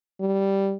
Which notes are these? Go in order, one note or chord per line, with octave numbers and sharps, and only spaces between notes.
G3